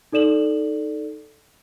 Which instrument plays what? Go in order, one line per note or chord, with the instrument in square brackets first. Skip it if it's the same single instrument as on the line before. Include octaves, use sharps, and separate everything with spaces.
[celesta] D#4 A4 D5 E7 F#7